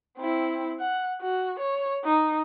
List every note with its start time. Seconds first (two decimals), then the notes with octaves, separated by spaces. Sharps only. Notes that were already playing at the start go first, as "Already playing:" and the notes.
0.18 C4 E4
0.80 F#5
1.21 F#4
1.60 C#5
2.04 D#4